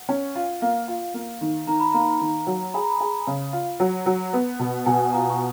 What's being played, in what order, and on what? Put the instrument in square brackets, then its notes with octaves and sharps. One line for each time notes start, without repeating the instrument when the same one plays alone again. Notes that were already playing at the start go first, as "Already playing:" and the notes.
Already playing: [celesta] F#5
[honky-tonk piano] C#4
F4
[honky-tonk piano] A#3 [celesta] F5
[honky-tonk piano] F4
A#3
D#3
[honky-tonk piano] D#3 [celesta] A#5
[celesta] B5
[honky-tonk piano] A#3 [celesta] A#5
[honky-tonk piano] D#3
F#3
[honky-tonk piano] G#4 [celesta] B5
[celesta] A#5
B5
[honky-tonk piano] G#4
C#3
F4
F#3
F#3
B3
B2
[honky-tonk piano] B2 [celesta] G#5
[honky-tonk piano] F4 [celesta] A#5
[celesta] C#6